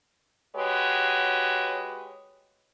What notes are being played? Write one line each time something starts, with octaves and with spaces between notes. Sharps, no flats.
G#3 F#4 G4 B4 C#5